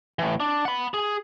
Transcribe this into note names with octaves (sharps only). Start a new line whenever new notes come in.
A2 E3
D4
F#5 B5
G#4